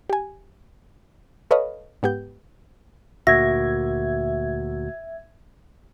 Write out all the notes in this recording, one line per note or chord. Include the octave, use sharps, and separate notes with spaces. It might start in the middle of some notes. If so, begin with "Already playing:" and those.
G4 G#5
A4 B4 C#5 D#5 F5
G#2 B3 G4 G6
D2 A#2 A#3 F#4 E5 G#6 A#6